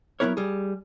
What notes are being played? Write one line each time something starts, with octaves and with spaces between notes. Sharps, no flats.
F#3 G3 B3 E4 A#4 C#5
G3 G#4